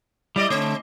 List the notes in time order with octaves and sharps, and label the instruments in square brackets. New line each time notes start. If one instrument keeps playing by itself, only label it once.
[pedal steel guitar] G3 [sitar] E4 D5 D#5
[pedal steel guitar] D3 A3 [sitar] C4